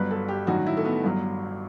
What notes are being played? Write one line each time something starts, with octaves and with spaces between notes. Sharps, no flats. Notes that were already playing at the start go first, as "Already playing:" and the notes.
Already playing: G1 G2 F#3 B4
A4
G4
A1 G2 D#3 F#3 F#4
E4
A3
B3
G1 G2 F#3